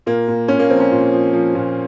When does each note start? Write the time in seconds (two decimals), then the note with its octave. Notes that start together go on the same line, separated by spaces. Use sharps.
0.06 A#2 A#3
0.28 A#2
0.48 A#2 C#4
0.59 A#3
0.70 F3 C4
0.80 C#4
0.92 A#2
1.12 F3
1.33 F3
1.55 A#2